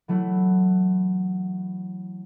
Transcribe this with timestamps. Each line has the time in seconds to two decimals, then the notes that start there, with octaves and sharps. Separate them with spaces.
0.08 E3 F#3 A3 E4